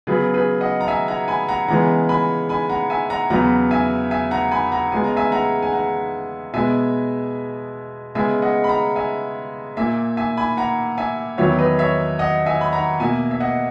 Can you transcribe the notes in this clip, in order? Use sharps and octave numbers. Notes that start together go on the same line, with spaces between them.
C#3 F#3 B3 G#4 B4
G#4 B4
D#5 F#5
A#5
E5 G#5
F#5 A#5
G#5 B5
F#5 A#5
C#3 E3 G#3 B3 F#5 A#5
G#5 B5
G#5 B5
F#5 A#5
E5 G#5
F#5 A#5
E2 C#3 F#3 B3 F#5 A#5
E5 G#5
E5 G#5
F#5 A#5
G#5 B5
F#5 A#5
C#3 G#3 B3 G#5
A#5
E5 G#5
F#5 A#5
G#5
F#5 A#5
B2 G#3 B3 E5 G#5
C#3 G#3 B3 E5 G#5
D#5 F#5
B5
F#5 A#5
E5 G#5
A#2 A#3 E5 G#5
E5 G#5
G#5 B5
F#5 A#5
E5 G#5
E2 D#3 F#3 B3 C#5 E5
B4 D#5
C#5 E5
D#5 F#5
E5 G#5
B5
F#5 A#5
B2 A#3 E5 G#5
E5
D#5 F#5